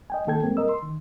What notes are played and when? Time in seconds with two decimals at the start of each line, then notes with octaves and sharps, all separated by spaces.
0.10 D#5 G5 G#5
0.27 D#3 A#3 A4 G5 G#6
0.43 F#2 G3 G#3 A#3 C4
0.57 A#4 D#5 E6
0.69 C6
0.82 D#3